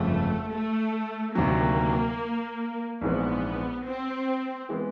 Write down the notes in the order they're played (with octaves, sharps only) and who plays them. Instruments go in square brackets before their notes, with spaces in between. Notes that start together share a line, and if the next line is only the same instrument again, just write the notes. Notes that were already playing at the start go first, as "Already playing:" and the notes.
Already playing: [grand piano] G1 F2 C#3 F3 G#3 [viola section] A3
[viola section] A3
[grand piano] D2 C3 D#3 F#3 [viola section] A#3
[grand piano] A#1 G#2 E3 G#3 C4 [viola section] B3
[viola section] C4
[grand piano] E3 G#3 B3